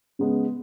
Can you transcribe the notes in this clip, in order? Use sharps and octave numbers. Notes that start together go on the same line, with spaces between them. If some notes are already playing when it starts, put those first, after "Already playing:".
C#3 G#3 B3